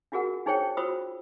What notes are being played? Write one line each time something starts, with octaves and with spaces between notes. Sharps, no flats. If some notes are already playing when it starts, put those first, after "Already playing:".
D4 F4 F#4 G#4 A#4 F#5
D4 D#4 G#4 C5 C#5 G5
F4 F#4 C5 B5 D#6 E6